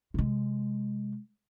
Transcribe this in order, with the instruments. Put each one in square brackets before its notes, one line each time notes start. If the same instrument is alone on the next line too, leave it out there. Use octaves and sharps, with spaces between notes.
[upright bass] C3 G#3